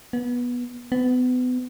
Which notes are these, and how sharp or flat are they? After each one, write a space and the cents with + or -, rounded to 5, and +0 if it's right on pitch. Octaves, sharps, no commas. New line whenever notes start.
B3 -15
B3 +30